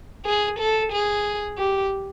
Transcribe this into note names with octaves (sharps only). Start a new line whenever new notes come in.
G#4
A4
G#4
G4